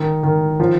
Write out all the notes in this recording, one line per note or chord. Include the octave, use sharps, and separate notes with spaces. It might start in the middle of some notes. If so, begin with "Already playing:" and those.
Already playing: D#3
D#3
F3